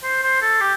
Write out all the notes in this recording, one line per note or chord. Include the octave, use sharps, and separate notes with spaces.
C5
C5
A4
G4